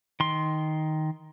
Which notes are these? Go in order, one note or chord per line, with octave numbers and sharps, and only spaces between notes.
D#3 C6